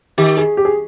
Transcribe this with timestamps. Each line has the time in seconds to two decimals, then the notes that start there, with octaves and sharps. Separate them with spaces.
0.18 D#3 G4
0.37 G#4
0.57 G4
0.65 G#4